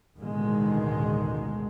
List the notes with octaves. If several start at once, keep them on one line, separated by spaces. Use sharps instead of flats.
A1 D2 B2 D#3 G#3